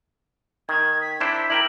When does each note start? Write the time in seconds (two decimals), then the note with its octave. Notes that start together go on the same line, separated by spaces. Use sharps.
0.69 D#3 G#6
1.02 B6
1.20 D4 E4 C5
1.50 E4 A#4 G5 F#7